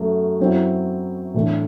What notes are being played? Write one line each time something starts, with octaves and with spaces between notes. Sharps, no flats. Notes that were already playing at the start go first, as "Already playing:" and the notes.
Already playing: F#2 F#3 A3
F#2 F#3 C4 E4
A2 E3 A3 D4